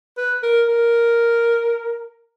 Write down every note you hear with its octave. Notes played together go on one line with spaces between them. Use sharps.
B4
A#4
A#4